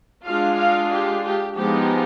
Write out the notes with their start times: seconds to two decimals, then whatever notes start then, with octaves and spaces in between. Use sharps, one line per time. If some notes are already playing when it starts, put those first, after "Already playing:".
0.25 G#3 D4 F4 F5
0.58 F5
0.91 G4
1.24 G4
1.56 F3 G#3 B3 D#4 G4